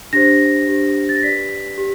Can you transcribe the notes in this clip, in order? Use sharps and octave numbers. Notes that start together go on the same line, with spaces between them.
D4 G4 C5 A#6
D4 G4 C5
A6
A#6
G4 B4 D5 B6
G4